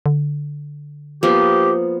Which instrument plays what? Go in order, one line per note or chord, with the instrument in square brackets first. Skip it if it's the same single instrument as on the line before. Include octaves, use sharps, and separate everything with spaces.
[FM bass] D3
[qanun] F3 A#3 B3 [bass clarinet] G4